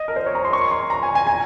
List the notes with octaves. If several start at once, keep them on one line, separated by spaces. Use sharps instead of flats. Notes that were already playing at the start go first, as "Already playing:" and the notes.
Already playing: D#5
A#4
C5
C#5
A#5
C6
C#6
C6
A#5
G#5
G#5
G#5